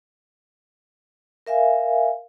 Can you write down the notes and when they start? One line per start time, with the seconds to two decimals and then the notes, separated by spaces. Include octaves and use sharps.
1.46 A#4 E5 F5 G#5